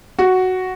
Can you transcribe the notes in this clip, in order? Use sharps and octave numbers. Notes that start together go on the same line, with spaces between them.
F#4